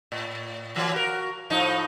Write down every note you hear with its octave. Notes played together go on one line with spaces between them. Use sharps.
A2
E3 F#3 A#3
F#4 A#4
A2 F3 D#4